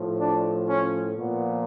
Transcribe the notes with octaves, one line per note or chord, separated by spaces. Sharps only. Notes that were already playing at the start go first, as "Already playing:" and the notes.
Already playing: A2 F3
D4
C#4
A#2 F3 B3